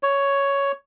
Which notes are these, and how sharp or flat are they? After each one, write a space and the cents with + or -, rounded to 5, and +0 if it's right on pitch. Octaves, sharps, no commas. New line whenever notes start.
C#5 +5